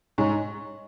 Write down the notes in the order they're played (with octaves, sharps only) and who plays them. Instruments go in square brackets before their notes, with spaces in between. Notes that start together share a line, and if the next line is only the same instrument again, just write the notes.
[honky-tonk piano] G#2 [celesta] C#5 G#5 C#6